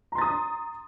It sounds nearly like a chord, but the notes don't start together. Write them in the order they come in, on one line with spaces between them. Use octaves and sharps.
A#5 C6 A6 D#6